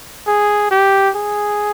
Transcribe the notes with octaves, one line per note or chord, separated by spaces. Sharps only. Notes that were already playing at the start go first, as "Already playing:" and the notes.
G#4
G4
G#4